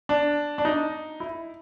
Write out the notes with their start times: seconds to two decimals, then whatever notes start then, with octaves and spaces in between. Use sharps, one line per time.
0.09 D4
0.58 D4
0.65 D#4
1.20 E4